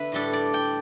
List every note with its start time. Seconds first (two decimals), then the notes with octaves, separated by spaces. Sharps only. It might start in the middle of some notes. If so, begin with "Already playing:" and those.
Already playing: D3 B3 B4 E5
0.12 A2 G3 D4 A4
0.33 D5
0.54 G5